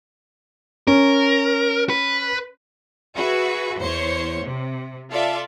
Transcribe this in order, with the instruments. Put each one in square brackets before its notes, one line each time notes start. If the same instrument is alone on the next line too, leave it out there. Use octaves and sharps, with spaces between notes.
[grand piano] C#4 [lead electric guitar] A#4
[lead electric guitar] B4
[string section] F#4 G#4 B4 E5
E2 C5 C#5 C6 C#7
C3
F4 A4 D5 E5